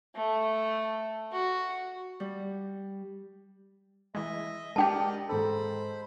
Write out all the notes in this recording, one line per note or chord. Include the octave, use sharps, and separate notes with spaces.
A3
F#4
G3
E3 G#3 D#5 E5
G#3 D4 G4 A#4 D5 D#5 G5 A5
G#2 A4 C5 B5